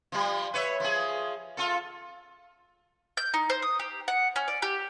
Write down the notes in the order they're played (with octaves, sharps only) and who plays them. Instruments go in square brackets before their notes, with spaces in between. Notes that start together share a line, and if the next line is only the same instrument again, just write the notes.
[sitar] F3 G3
B4 C#5 E5
F3 G#4
F4 A4
[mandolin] G6
D#4
C5
D#6
G4
F#5
C#4
D5
G4